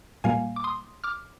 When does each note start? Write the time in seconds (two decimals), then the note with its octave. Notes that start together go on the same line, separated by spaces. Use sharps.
0.24 A#2 G3 A#3 F5 G#5
0.56 D6
0.64 C6 D#6
1.04 D6 F6